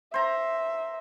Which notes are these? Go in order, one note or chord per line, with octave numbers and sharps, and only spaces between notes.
C5 E5 A#5